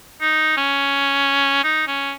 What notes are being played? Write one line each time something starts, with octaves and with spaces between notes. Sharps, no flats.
D#4
C#4
D#4
C#4